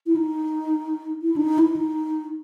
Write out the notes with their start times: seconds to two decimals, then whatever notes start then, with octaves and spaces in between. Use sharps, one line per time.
0.07 E4
0.16 D#4
1.22 E4
1.36 D4
1.41 D#4
1.58 E4
1.76 D#4